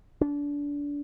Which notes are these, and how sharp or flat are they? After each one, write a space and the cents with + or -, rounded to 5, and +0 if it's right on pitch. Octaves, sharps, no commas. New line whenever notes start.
D4 -25